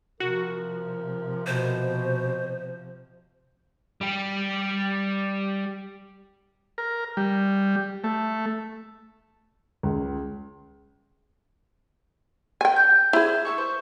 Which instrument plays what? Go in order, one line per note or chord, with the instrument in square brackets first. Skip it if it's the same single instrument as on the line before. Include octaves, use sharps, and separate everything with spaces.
[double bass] C3 F3 [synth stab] F#4 [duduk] A#4
[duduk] B2 [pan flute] C5
[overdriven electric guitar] G3 G4
[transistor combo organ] A#4
G3
A3
[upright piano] C#2
[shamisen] G5 G#5
[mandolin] G6
[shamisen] E4 G#4 [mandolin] C5
[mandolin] A3 E5 C#6
C5